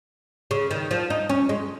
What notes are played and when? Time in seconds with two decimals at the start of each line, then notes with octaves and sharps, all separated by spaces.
0.51 C#3
0.71 D#3
0.91 F3
1.10 D#4
1.29 C#4
1.49 G#3